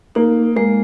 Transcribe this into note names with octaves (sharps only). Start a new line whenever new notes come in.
A#3 D#4
G#3 A#3